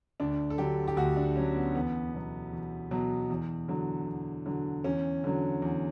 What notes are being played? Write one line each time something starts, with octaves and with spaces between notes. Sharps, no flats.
D2 D4
A4
D3 F#3 G4
G4
D2 F#4
D4
D3 F#3 C#4
B3
E2 B3
B2 F#3
E2
B2 F#3
E2
D3 F#3
E2
D3 F#3
E2 C#4
D3 F#3
E2